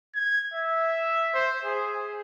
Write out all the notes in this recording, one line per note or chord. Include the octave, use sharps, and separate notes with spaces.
G#6
E5
C5
G#4